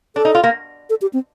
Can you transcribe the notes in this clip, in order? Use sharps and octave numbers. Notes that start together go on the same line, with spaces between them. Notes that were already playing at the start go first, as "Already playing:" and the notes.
D4 A4
D#4
F4
A#3
A4
G4
C4